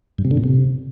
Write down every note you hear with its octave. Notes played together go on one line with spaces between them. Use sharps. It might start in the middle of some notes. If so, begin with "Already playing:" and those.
G2
C3
D3
A#2
C3